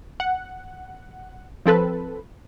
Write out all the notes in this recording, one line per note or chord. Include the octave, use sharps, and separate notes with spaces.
F#5
F3 C4 A4 B4